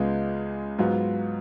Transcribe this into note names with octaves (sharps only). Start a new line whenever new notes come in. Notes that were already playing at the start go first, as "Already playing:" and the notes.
Already playing: C#2 C#3 G#3 B3 F4
G#2 F#3 B3 F4